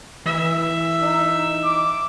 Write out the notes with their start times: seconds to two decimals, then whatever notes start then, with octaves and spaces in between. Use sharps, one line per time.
0.26 E3 E5
1.02 D#4
1.63 D6